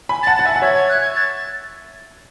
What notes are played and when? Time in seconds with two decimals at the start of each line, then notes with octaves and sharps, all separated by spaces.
0.09 G#5 B5
0.23 F#5 A5 A6
0.37 F#5 A6
0.45 E5 G#5
0.50 A6
0.56 F#5
0.62 C#5 E5 G#6
0.75 G#6
0.89 F#6
1.01 G#6
1.16 A6